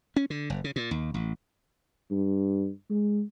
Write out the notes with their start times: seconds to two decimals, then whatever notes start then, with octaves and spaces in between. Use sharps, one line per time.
0.16 C#4
0.30 D3
0.50 F#1
0.64 C#3
0.76 A#2
0.91 D#2
1.14 A1
2.11 G2
2.90 G#3